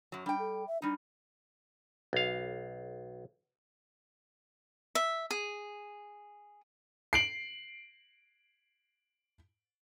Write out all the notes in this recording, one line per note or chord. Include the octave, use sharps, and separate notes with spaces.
F#2 F#3
G3 D4 G5
A4
E5
G3 D4 D#4
B1 F5
E5
G#4
C7 D7 F#7